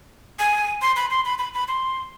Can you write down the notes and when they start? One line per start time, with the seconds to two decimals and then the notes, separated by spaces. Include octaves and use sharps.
0.39 G#5
0.82 C6
0.96 B5
1.11 C6
1.25 B5
1.39 B5
1.54 B5
1.68 C6